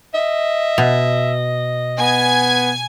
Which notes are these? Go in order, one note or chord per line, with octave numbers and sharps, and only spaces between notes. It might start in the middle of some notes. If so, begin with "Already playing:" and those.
D#5 E5
B2
B3 G#5